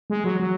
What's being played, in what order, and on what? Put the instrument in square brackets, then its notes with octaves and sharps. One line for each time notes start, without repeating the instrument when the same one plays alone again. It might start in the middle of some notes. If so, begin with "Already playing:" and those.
[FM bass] G#3
F#3
F#3